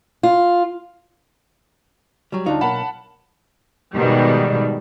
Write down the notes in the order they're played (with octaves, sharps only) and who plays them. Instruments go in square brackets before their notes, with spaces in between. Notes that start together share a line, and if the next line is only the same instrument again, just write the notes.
[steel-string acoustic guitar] F4
[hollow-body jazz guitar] F#3 G3
[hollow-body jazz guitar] D2 D#4 C#5 [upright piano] D4 F4
[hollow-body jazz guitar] B1 A#3 [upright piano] F#5 A5 B5
[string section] G#2 B2 D#3 G3